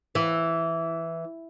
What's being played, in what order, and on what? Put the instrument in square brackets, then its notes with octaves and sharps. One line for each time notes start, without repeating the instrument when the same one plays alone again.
[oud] E3